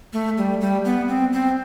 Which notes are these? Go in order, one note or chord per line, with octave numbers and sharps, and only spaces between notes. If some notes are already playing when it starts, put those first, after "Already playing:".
A3
G3
G3
B3
C4
C4